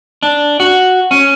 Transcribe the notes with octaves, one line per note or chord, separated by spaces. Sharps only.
D4
F#4
C#4